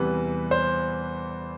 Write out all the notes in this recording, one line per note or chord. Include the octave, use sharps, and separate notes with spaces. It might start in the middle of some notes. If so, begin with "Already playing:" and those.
Already playing: E2 C3 E3 G3 B4
C5